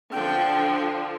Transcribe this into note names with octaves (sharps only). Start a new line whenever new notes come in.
D3 F3 G5